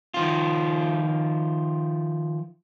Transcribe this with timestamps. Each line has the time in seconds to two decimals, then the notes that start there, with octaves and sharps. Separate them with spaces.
0.14 D#3 F3 F4